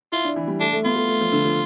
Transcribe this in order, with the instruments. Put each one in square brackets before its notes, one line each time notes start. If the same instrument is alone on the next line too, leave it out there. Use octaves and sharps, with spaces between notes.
[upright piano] E4 [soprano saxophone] F4
[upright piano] D4
E3
G3
[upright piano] A3 [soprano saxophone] D4
[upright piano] A3
[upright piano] B3 [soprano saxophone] F4
[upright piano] A3
A3
F3
D3
F3